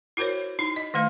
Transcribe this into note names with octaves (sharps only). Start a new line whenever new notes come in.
E4 F#4 A#4 C5 C#5
D#4 E4
D#5
D#3 A3 B4 F5